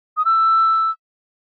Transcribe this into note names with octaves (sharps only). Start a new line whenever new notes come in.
D#6
E6